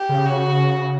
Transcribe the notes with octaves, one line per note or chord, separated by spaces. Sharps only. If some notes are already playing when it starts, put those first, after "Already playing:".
Already playing: G4
C#3
F#4